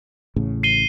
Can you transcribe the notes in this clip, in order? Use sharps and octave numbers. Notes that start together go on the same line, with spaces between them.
A1 A2 C#3
C7 D#7 G7